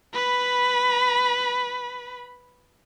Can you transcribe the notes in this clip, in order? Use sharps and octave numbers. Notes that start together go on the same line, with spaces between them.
B4 B5